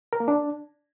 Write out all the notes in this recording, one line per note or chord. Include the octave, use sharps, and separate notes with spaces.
A#4
A#3
D4